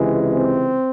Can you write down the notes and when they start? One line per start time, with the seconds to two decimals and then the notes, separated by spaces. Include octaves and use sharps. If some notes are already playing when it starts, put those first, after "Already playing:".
Already playing: C#2 C3 E3 G#3
0.31 C4